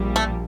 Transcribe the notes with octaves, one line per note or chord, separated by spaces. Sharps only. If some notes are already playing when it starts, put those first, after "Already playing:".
Already playing: A#1 A#2 G3
A3